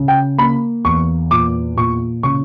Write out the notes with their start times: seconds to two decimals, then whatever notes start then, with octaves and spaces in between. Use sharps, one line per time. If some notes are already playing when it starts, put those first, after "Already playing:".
Already playing: C#3
0.08 G5
0.38 A#3 B5
0.85 E2 C#6
1.31 A#2 D6
1.77 A#2 C#6
2.23 C#3 C#6